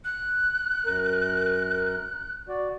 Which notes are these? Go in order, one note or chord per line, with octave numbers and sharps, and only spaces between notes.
F#6
F#2 A#4
F#4 D5